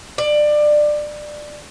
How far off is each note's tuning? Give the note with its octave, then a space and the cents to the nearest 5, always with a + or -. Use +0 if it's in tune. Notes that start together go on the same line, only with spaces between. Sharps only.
D5 +20